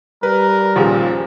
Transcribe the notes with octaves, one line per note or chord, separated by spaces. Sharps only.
G3 A#4 B4
D#2 A#2 C#3 F3